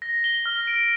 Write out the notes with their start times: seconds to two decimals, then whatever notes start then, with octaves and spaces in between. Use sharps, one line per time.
0.02 A#6
0.24 G7
0.46 F6
0.67 D7